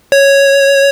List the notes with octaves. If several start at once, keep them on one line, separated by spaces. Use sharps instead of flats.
C#5